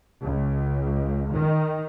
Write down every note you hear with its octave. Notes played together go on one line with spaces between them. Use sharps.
C#2
D#3